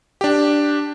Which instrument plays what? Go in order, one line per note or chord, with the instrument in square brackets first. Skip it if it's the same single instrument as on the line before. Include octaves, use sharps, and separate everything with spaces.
[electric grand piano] D4 G4